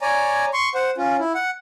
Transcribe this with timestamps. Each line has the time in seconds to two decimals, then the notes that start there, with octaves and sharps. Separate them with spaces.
0.01 C#5 D5 G#5 A#5
0.53 C6 C#6
0.75 C5 F#5
0.97 C#4 F4
1.19 E4
1.35 F#5